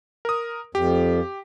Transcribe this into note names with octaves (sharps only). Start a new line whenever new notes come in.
A#4 D#6
F2 G4